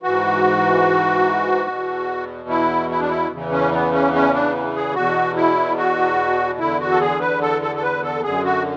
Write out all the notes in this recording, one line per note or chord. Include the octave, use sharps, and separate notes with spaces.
G#2 E3 F#4
E2 B2
E4
E4
D4
E4
E2 C#3 E3
C#4
B3
C#4
C#4
D4
G#4
E2 B2 F#4
E4
F#4
E2 D3 E4
F#4
A4
G#4
B4
A4
A4
A4
B4
A4
F#2 D3 G#4
F#4